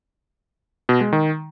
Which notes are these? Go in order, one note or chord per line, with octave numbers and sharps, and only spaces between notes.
B2
G#3
D#3